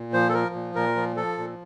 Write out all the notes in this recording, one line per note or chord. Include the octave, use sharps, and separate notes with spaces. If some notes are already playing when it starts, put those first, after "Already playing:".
Already playing: A#2
F3 C5
A4
F3 A#4
A#2
A#2 A#4
F3
F3 A4
A#2